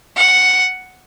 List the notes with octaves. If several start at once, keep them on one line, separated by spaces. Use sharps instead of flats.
F#5